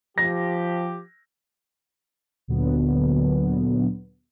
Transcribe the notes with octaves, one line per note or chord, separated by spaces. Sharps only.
F3 G4 A#6
D2 A#2 D3 F#3 B3